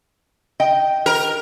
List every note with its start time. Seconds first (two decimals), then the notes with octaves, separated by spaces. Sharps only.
0.60 D#5 G5
1.06 A#4